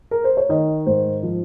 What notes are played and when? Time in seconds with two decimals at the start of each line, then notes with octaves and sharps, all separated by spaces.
0.11 A#4
0.24 C5
0.37 C#5
0.49 D#3 D#5
0.86 G#2 C5
1.23 F3